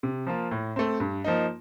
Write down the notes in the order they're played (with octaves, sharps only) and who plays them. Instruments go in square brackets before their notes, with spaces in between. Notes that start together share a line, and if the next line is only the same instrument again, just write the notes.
[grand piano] C3
F3 A#3 F4
A2
A3 C4
G2
F3 A#3 D#4